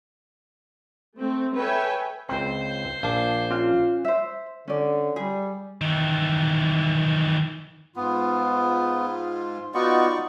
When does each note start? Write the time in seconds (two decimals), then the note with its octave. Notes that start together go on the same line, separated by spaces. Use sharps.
1.17 A3 C4
1.55 A4 B4 C#5 E5 G5 G#5
2.29 C#2 C4 C5
3.03 A#1 F5 A5 D6
3.51 C#4 F4 F5
4.05 C5 E5
4.68 D3 C#4 D5
5.16 G3 G#4
5.81 D#3 E3
7.96 G#2 B3 F4
9.74 B3 D#4 F4 F#4 D5 C#6